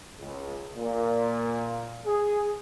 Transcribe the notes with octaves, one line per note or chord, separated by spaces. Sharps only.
C#2
A#2
G#4